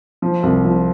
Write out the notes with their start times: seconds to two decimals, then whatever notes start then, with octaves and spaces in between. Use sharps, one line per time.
0.22 F3
0.43 C2
0.65 F3